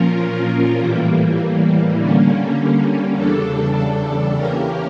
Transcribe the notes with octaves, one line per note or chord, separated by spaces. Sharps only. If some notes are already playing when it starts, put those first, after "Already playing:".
Already playing: A#2 F3 C#4 F4 A#4
A2 E3 G3 A#3
D3 G3 A#3 C#4
E2 C#3 G3 D4 A4
E3 A#3 C#4 G4 A#4